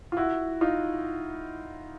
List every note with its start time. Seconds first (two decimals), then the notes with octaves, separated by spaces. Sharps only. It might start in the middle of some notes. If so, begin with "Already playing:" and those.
0.12 F4
0.17 E4 F#4
0.61 D#4 F4